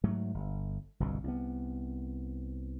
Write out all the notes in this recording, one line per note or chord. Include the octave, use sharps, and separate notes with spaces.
G#2 F#3 A3
G1
G1 C2 B2
C2 B3